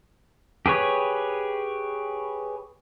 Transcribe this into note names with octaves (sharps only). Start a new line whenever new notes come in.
G4 G#4 B4 C#5